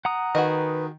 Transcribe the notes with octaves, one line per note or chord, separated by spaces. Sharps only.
F#5 A#5 D#6
D#3 F#4 G#4 B4 D#5